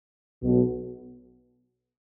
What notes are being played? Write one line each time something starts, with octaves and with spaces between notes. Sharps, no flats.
B1 B2